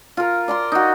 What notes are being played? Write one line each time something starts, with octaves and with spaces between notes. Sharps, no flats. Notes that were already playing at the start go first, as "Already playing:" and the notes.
F4 A#4
D5 A#5 C6
D#4 F#4